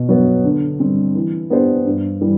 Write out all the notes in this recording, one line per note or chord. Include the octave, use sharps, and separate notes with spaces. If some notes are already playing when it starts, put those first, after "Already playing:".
Already playing: B2
F#3 B3
D3
G3 C4
E3
B3 D4 G4 C5
G2
E3 G3